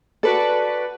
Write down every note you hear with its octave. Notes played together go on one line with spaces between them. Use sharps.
F#4 A4 B4 D5